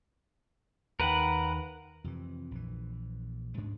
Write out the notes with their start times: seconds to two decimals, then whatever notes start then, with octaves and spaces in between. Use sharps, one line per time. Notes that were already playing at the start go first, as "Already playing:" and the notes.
1.00 D#2 D#3 A#4 B4 F#5
2.04 F2 C3 E3
2.51 A#1 E3
3.57 D2 G#2 D4